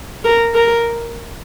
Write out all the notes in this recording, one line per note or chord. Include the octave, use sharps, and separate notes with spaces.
A#4
A#4